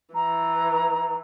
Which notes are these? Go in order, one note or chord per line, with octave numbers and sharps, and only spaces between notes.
E3 A#5